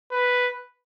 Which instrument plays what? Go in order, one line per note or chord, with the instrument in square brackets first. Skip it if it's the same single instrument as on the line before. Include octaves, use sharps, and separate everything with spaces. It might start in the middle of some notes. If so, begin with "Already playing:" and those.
[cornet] B4